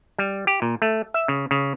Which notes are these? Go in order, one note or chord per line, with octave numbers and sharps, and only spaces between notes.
G3
G4
A#2
A3
E5
C#3
C#3